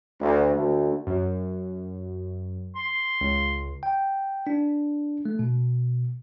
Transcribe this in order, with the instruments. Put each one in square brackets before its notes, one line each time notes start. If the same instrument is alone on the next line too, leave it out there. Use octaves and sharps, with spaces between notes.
[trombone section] D2
D2
[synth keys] F#2
[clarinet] C6
[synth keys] C#2
[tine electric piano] G5
D4
A3
B2